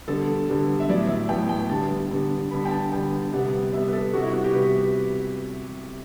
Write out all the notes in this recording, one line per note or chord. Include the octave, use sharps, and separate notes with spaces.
D3 G3 B3 A4
D3 G3 B3
E5
A2 F#3 B3 D5
E5
A2 F#3 B3 G5
G5
D3 G3 B3 A5
D3 G3 B3
D3 G3 B3 B5
G5
A5
D3 G3 B3 G5
C3 G3 B3 F#5
C3 G3 B3 E5
B4
A4
C3 G3 B3 F#4
E4
F#4
G4
C3 G3 B3 B4